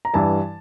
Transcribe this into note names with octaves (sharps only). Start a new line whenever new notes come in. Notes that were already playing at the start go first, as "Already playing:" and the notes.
A#5
G2 E3 G3 A5